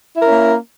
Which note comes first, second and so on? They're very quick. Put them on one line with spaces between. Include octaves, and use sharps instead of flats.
E4 A#4 C#4 A#3